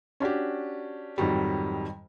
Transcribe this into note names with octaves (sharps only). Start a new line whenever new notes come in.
C#4 D4 F#4 G4
F2 G#2 D#3 F#3 G3